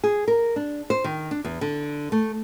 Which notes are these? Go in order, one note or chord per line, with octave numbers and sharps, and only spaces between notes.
G#4
A#4
D4
C5
D#3
D4
E2
D3
A3